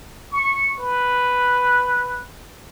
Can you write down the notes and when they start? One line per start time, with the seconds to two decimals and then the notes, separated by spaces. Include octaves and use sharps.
0.31 C#6
0.78 B4